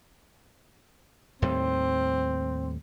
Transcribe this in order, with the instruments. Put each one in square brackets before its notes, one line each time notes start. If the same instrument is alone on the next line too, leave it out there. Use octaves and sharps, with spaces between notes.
[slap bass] D#2 A2 G3 [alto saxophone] C4